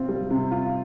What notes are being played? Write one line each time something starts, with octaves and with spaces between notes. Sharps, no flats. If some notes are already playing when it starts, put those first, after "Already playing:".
Already playing: C3 C4 F4
G3
C3
F4